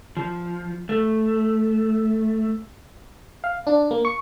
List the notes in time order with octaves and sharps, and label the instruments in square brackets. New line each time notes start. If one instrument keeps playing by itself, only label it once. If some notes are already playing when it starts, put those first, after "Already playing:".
[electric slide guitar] F3
A3
[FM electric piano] F5
D4
A#3
C#6